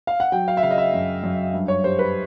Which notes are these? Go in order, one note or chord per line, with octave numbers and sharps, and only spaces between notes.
F5
F#5
F#3 G5
F5
E5
C#3 F5
D#5
E5
F#2
F#2
G2
C#5
G3 C5
B4